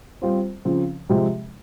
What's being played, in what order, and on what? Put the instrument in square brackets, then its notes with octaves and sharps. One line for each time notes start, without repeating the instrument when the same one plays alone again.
[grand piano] G3 C4 F4 C5
C#3 F3 C4
C3 F3 G#3 C4 G4